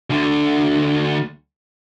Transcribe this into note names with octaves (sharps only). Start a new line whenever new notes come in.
D2 D3